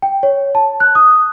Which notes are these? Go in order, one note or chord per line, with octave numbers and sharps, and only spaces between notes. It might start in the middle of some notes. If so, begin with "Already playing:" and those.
G5
C#5
A5
F#6
D#6